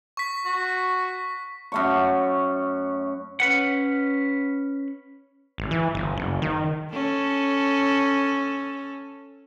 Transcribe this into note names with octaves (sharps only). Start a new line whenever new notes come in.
C#6 B6
F#4
F#2 A3 C#6
C#4 B4 F#5
G#1
E3
G1
F#1
D#3
C#4 A4